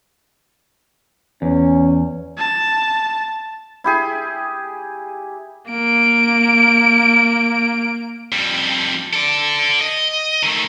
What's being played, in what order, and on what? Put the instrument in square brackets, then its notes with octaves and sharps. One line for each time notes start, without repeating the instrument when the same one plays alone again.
[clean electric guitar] E2 [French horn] C#4
[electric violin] A5
[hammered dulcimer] E4 G4 G#4
[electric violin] A#3 D7
[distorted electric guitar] F2 G3
A4 D5
D#5
D#3 A3